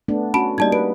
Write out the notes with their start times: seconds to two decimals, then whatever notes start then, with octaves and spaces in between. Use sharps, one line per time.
0.08 A3 B3 D4
0.34 C#4 F#4 A5 B5 D7
0.58 G3 A#3 D#4 D5 A5 G#6
0.72 B4 D7